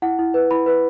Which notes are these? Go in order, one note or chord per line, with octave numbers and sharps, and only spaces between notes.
E4 F#5
E4
B4
E4 B5
B4